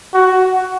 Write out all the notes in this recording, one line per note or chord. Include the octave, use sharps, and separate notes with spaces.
F#4